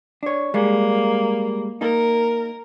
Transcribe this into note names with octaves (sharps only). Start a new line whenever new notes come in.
D4 C#5
G3 G#3 A#3
A#3 D#4 A#4